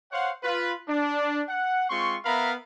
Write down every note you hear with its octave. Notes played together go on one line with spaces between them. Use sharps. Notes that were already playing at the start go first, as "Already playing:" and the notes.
C5 C#5 F5 F#5
F4 B4
D4
F#5
G#3 C4 F4 C6 C#6
B3 A#4 E5 F5 A#5 B5